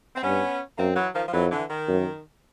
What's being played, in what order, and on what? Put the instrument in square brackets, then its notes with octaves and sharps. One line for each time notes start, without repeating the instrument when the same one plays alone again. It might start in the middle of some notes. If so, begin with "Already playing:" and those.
[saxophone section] C4
[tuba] G2 [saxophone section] B3 C#4
[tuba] F#2 [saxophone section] A#3 C4
[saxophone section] E3 F#3
D#3 F3
F3
[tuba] F2 [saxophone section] E3 F#3
[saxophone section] D3 E3
D#3
[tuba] F#2